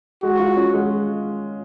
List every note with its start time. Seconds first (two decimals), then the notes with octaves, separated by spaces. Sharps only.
0.23 G#3 F#4
0.39 F4
0.57 C#4
0.73 G#3